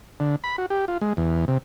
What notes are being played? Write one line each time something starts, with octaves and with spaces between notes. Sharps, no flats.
D3
B5
F#4
G4
F4
G#3
E2
C3